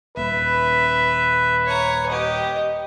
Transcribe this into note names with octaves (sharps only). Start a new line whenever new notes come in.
D#1 B4 E5
C#5 A#5
G4 D#5